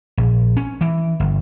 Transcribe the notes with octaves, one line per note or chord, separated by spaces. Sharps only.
A#1
C#4
E3
G1